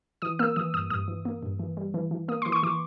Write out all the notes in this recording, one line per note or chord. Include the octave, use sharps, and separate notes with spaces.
E3 D#6
A#3 E6
E3 D#6
G2 D#6
G2 D#6
E3
A#3
G2
E3
G3
E3
E3
A#3 D#6
E3 C6
C#6
E3 D6